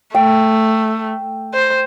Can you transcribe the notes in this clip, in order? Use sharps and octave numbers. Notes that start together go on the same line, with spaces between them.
A3 G5
C5